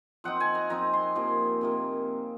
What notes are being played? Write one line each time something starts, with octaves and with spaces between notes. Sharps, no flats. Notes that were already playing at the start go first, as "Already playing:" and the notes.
F3 C4 D#4 F#5
G#5
A#5
F3 C4 D#4 A#5
C6
C3 F3 A#3
C3 F3 A#3